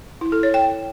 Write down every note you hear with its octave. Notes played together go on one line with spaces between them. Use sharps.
E4
A4
C#5
G5